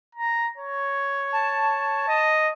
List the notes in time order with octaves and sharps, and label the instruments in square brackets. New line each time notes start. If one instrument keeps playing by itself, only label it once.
[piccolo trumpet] A#5
C#5
[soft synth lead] A5
[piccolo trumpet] D#5